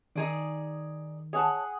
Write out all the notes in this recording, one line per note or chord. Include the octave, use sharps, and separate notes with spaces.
D#3 D#4 G#4 D5
G#4 C#5 F#5 A5